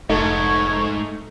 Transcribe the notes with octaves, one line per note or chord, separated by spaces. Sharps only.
F1 G#2 A3 D#4 C#6 G#6